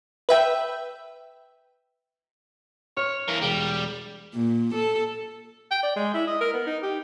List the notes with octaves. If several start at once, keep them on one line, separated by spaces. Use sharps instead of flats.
B4 E5 G5
C#5 F6
E3 A#3 A#4
E1 G3 G5
A#2
A4
G5
D5
G#3
E4
D#5
A#4
B3
D#4
G4